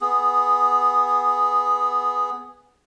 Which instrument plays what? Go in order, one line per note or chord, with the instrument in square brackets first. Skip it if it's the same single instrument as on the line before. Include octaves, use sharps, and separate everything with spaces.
[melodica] B3 G#4